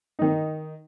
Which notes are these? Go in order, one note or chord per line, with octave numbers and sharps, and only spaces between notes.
D#3 D#4